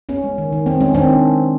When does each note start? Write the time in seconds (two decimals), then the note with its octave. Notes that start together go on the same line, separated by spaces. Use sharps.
0.09 B3 C#4
0.24 G#3
0.38 D#3
0.52 D#3
0.66 B3 C4
0.80 G#3 C#4
0.94 D#3 C4 D4